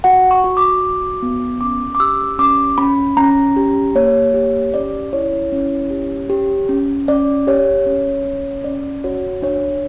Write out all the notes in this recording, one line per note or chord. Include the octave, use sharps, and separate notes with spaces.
F#4 F#5
C#6
F#4
D6
F#4
B3
C#4 D6
D6
G4 E6
C#4 D6
C#4 B5
C#4 A#5
G4
A#3 C#5
G4
C#4 D5
E4 C#5
C#4
G4
G4
C#4
C#4 D5
G4 C#5
C#4
C#4
C#4 D5
F#4 C#5
D4 C#5